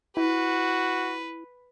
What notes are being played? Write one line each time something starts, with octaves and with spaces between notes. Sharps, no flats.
E4 F#4 B4